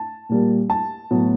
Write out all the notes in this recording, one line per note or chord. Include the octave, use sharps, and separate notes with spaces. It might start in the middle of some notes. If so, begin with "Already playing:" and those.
Already playing: A5
A#2 G3 A#3
A5
A2 F#3 B3